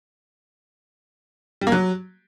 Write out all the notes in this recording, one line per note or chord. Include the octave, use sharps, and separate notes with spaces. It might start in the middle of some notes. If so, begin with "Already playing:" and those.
G3
A#3
F#3